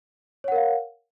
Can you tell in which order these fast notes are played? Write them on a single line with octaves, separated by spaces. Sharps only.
C#5 F#5 A#4 F5